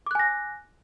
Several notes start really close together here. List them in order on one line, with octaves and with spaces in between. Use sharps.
D6 F#6 G#5 A#6